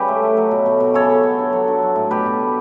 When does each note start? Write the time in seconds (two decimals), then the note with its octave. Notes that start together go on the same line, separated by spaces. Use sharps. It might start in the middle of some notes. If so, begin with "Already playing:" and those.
Already playing: C#3 G3 G4 B4
0.08 A3
0.23 A3
0.37 F#3
0.51 B2
0.66 B2
0.80 B2
0.94 C#3 A4 C#5
1.10 C#3
1.23 B3
1.39 D3
1.53 F#3
1.68 D3
1.82 F#3
1.96 A2
2.11 B2 G4 B4
2.26 B2
2.40 G3